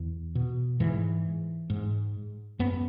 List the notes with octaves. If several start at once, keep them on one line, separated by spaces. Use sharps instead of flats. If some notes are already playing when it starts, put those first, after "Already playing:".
Already playing: E2
B2
G#2 E3
G#2
F#2 B3